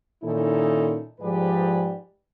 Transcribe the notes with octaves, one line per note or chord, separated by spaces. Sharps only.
A#2 D#3 C#4 D#4 E4 A4
G#2 F3 G4 G#4 B4 D5